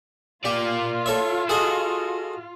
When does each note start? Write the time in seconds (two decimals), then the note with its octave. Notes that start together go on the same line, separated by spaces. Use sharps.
0.45 A#3 F4 G4 D5
1.06 A4 C#5 E5
1.49 F#4 G#4 A4 D#5